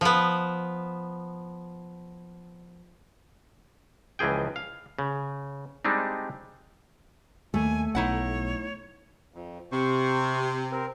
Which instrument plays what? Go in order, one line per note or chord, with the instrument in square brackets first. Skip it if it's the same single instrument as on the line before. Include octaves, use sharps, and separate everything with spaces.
[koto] F3 B3
[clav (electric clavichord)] C#2 E3 F3 G#4 G5
F5
C#3
G3 G#3 C4 D4 D#4
[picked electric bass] D#2 [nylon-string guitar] A3 [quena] G#5
[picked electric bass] B1 [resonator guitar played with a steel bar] D#4 E4 F#5 [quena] C#5
[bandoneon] F2
[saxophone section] C3 [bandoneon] C5 C#6
[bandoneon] C4 A#4